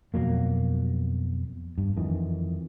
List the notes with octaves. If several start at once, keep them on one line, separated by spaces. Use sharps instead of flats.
F2 B2 F#3 A#3
G2
F2 D#3 E3